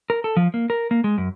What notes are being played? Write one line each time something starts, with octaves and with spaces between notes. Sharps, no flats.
A#4
A4
F3
A#3
A#4
A#3
G#3
F#2